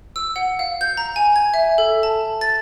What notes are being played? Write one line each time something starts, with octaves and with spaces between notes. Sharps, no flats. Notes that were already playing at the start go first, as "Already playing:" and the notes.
E6
F#5
F5
G6
A#5
G#5
G#6
E5
A4
A5
A6